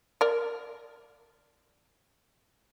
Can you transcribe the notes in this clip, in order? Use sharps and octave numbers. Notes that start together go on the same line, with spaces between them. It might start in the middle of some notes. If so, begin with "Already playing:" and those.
A#4 D5